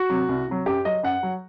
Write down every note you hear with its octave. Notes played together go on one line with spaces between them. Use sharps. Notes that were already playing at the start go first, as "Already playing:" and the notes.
Already playing: F#4
C3 F#3
C2
C3 F#3
F#2 G4
F#3 D#5
F#2 F#5
F#3